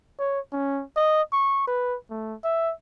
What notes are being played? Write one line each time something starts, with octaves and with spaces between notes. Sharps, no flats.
C#5
C#4
D#5
C#6
B4
A3
E5